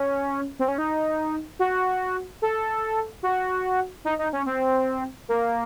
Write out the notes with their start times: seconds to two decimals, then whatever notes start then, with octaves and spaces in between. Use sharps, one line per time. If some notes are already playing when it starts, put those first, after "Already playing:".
Already playing: C#4
0.59 C4
0.68 C#4
0.78 D#4
1.59 F#4
2.42 A4
3.23 F#4
4.05 D#4
4.19 D#4
4.33 C#4
4.46 C4
5.28 A#3